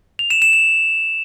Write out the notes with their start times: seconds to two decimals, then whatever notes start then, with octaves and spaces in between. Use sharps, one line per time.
0.19 F7
0.30 E7
0.42 E7
0.53 F7